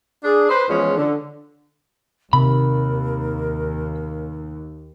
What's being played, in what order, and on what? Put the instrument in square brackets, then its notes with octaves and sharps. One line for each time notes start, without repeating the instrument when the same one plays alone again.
[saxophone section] D4 G#4
B4 C5
E2 F3 G#3 C#4
D3
[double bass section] D#2 [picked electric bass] C3 [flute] A#4 [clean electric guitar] B5